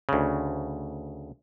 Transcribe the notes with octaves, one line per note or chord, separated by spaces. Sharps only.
D2 C#3